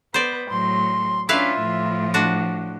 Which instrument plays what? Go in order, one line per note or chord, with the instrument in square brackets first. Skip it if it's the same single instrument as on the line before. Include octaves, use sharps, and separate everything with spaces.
[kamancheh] B3 [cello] B4 [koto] C5 D5
[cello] A2 F#3 [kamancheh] C6
[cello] C#4 D4 [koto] E4 B4 F5 [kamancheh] F4 E5
[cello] A2 F3
[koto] D4 F#4